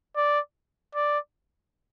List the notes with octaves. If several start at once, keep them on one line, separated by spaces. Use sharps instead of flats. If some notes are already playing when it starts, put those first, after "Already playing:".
D5
D5